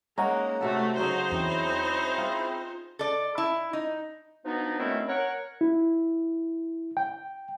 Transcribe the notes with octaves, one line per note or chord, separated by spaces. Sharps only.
G#3 A#3 C#4 D#4 F#5 A#5
C3 A3 F#4 A4 E5
C#3 F#3 C#4 D#4 F#4 G#4 C5
E2 C4 E4 G#4
G6
F4
A4 D5
E4
D#4
B2 F3 B3 D4 D#4
D#3 F#3 A3 C4 C#4 E4
A#4 C#5 F#5
E4
G5